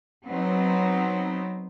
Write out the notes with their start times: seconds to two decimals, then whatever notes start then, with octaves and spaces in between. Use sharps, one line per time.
0.25 F#3 B3 C4 D#4